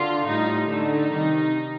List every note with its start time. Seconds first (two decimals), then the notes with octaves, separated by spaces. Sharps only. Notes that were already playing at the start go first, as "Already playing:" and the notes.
Already playing: D3 F4
0.26 A2 G3 D#4
0.68 D3 A3 D#4
1.09 C3 D#3 G3